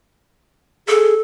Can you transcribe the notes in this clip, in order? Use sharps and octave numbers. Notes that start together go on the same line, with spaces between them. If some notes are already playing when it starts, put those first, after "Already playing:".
G#4 A4